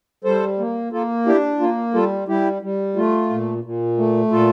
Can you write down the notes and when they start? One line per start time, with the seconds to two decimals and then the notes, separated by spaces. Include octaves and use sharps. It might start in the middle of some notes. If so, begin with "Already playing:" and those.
0.24 G3 A4 C5
0.59 A#3
0.92 A#3 F4 A4
1.26 D4 E4 G4
1.60 A#3 F4
1.94 G3 F4 A4
2.28 G3 E4 G4
2.62 G3
2.96 A3 F4
3.30 A#2
3.64 A#2
3.97 A3
4.31 A#2 F4 A4